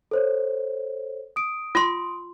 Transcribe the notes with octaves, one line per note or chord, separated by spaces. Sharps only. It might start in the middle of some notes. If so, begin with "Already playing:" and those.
A4 C5 C#5
D#6 D7
F4 C6